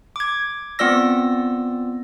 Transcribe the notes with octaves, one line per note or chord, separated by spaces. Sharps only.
D6 G#6
B3 C4 F4 D5 E6 A#6